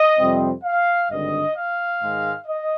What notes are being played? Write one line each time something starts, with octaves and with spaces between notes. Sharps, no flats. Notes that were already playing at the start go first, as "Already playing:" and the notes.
Already playing: D#5
F2 C3 G3 C4
F5
G#1 G2 D3 D#5
F5
G#2 D#3 G#3
D#5